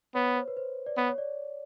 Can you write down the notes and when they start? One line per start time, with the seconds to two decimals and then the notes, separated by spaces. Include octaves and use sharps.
0.15 B3 C#5
0.27 C#5
0.36 C5
0.48 B4
0.57 C5
0.86 D5
0.97 B3 C#5
1.09 C#5
1.18 D5